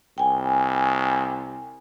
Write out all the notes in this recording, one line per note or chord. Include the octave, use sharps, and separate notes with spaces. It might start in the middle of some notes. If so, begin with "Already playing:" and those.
C2 G5 G#5